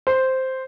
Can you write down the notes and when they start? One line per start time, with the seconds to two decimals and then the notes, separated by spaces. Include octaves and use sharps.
0.07 C5